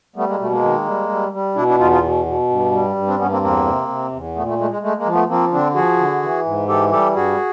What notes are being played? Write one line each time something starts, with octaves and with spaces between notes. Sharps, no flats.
G3 A3 B3
G#3 A#3
B2 A3
G#3 A#3
D#3
G3
G3
G3
B2 D4 E4
D4 E4
E2 D#4 F4
D#4 F4
B2
B2
G2
G3
G2
C4 D4
G2 B3 C#4
A#3 C4
E2 A#3 C4
C3
C3
E2
A#2 A3 B3
A3
G#3 A3
G#3
G#3 A3
G#3 A#3
F3
A3 B3
F3 A#3 C4
D3 C4 D4
F3 F#4 G#4
D3
E3
G#2
E3 G4 A4
G3 G4 A4
G2 F#4 G#4